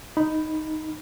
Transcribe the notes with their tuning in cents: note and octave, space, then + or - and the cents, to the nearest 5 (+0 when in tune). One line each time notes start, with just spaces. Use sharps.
D#4 +0 B5 +0